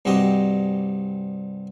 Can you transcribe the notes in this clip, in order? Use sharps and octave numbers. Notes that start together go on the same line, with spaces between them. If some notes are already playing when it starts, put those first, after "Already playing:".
C2 G2 C4 F#4 G4 D#5